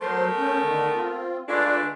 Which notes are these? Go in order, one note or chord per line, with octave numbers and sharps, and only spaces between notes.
F#3 A3 B3 A#4 C5 C6
C#4 G6
D3 D#3
C4 F4
G#3 A3 D4 F4 B4 D5
D3